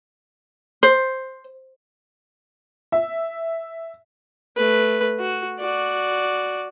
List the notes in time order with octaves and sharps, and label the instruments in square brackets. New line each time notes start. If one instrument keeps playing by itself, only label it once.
[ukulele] C5
[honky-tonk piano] E5
[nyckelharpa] A3 B4
F#4
F#4 D5